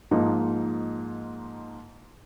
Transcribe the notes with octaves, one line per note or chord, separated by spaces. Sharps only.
G#2 F3 A#3 D#4